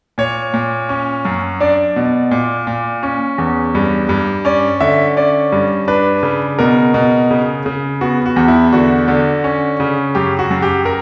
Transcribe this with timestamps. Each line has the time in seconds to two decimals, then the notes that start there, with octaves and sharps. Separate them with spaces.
0.18 A#2 C#5
0.54 A#2
0.89 C#4
1.25 F#2
1.60 D4 D5
1.96 B2
2.31 A#2
2.67 A#2
3.03 C#4
3.38 E2
3.75 G2
4.09 G2
4.45 C#4 D5
4.81 D3 E5
5.17 C#4 D5
5.52 G2
5.88 D4 B4
6.23 C#3
6.59 B2 A#4
6.94 B2
7.31 C#3
7.66 C#3
8.01 B3 F#4
8.26 F#4
8.36 E2
8.48 E4
8.73 D3 F#4
9.08 D3
9.44 C#4
9.80 C#3
10.15 F#2 G4
10.39 F#4
10.50 F#2
10.62 G4
10.85 A#4